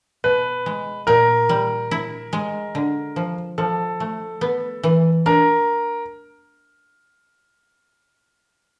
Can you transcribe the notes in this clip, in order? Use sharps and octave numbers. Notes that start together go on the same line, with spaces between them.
B2 B4
G#3
A#2 A#4
G3
E4
G#3
D3
F3
F3 A4
A3
B3
E3
D4 A#4